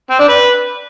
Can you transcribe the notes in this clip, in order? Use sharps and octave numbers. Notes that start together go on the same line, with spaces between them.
C4
D4
B4